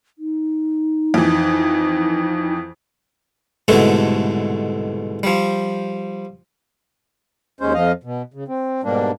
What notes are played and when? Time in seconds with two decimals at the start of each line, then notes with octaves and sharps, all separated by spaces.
0.19 D#4
1.14 F2 E3
3.68 C2 G#2 B2 D3 A3 A4
5.23 F3 G3
7.61 D#2 G#3 C#4 C5
7.74 F2 F3 D#5 F5
8.04 B2
8.34 C#3
8.48 C4
8.84 G#2 B2 G3 A#3 D4